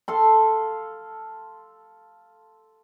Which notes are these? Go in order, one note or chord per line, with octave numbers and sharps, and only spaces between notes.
A4 F5 C6